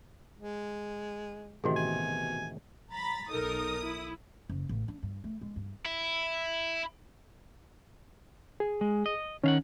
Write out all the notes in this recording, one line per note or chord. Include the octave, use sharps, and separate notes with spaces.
G#3
A1 C3 D#3 F#4 G#4
B2 G#5
A#5 B5 A6
B1 D#4 A4 A#4 D#6
E4
F#1
A1
D4
G2
A3
G#3
G2
E4
G#4
G#3
D#5
D#3 C#4 F5 F#5